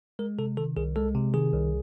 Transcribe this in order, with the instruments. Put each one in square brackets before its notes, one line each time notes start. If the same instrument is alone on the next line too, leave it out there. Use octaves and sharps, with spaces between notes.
[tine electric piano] G#3 A#4
C3 A4
D#3 A4
C2 G#4
G#3 A4
C3
D#3 G#4
C2